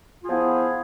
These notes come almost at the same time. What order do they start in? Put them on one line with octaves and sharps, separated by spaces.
F4 G#4 F3 B3 E4